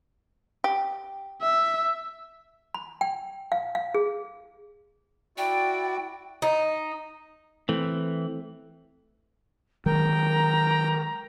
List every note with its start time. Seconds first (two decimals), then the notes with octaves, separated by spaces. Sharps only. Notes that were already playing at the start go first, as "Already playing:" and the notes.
0.64 G4
1.42 E5
2.74 B5
3.01 G5
3.52 F5
3.75 F5
3.95 G#4
5.38 E4 F#4 D5 G5
6.42 D#4
7.69 E3 A3 C4
9.86 D#3 F#3 G#3 A#4 G5 A#5